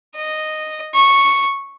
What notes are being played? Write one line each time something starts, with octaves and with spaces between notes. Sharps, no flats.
D#5
C#6